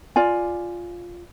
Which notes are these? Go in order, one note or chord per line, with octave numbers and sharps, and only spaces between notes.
F4 D5 G#5